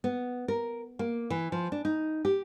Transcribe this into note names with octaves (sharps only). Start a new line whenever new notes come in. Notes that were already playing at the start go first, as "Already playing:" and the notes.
B3
A#4
A#3
E3
F3
D4
D#4
G4